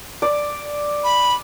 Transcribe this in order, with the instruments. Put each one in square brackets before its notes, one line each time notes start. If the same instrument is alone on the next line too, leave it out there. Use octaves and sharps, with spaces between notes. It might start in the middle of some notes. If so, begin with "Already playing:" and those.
[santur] D5
[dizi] B5